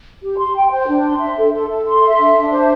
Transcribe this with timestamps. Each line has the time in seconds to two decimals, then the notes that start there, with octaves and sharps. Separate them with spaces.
0.22 G4
0.38 C6
0.55 G5
0.71 C5
0.88 D4
1.04 C6
1.21 E5
1.37 A4
1.53 A4
1.69 A4
1.87 C6
2.03 E5
2.19 D4
2.36 D4
2.52 C5